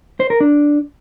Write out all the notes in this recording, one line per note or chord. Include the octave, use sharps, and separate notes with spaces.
C5
A#4
D4